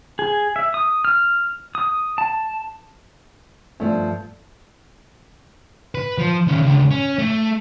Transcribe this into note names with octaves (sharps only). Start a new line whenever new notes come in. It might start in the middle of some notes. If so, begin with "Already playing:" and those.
G#4
E5
D#6
F6
D#6
A5
G2 F3 A3
B4
F3
D#3 C#4
C#2 D3
C#4
A3